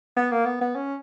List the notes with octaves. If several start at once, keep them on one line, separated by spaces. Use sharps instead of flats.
B3
A#3
B3
B3
C#4